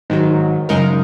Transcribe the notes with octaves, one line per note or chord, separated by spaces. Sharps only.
G#2 D#3 F#3
F#2 C#3 G#3 D#4 A#4